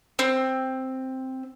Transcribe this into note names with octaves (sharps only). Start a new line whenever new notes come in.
C4